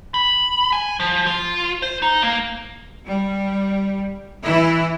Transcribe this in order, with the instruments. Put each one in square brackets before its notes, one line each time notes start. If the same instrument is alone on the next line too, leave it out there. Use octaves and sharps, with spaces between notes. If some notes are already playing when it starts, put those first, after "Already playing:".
[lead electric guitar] B5
G#5
F3
F4
C5
D#4
A#3
[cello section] G3
E3 E4